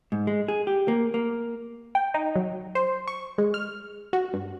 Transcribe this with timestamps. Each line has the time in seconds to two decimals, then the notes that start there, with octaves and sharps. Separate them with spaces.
0.12 G#2
0.27 G#3
0.48 G#4
0.67 G4
0.88 A#3
1.14 A#3
1.95 G5
2.14 D#4
2.36 F#3
2.75 C5
3.08 C#6
3.38 G#3
3.54 F6
4.13 F#4
4.33 G2